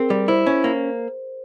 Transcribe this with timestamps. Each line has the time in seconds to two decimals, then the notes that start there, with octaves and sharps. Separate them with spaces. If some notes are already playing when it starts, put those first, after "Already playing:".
Already playing: C4 G#4 A#4
0.10 G3
0.28 E4 C5
0.46 C#4
0.64 A#3